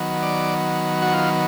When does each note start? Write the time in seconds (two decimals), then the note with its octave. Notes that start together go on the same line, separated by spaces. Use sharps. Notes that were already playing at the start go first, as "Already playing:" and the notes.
Already playing: D#3 F#3 B3
0.23 D5
1.02 F#4
1.13 F4